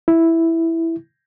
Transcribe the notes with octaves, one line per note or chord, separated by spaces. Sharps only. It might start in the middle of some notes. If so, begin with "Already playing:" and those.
E4